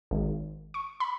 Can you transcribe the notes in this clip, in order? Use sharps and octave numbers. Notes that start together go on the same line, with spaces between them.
G#1
C#6
B5